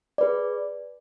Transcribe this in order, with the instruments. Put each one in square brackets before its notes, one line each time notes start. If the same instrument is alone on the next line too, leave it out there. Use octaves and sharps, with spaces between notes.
[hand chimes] G#4 B4 D5